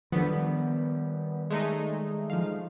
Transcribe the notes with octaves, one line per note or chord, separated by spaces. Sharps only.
D#3 F3 G3 B3 D4 A4
G#3 A3 D#4
F3 F5